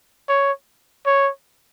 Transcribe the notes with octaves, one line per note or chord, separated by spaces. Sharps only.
C#5
C#5